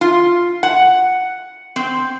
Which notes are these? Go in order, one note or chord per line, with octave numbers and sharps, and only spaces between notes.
F4
F#5
C4